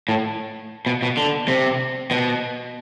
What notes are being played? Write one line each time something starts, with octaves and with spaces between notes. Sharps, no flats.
A2
B2
B2
D3
C3
B2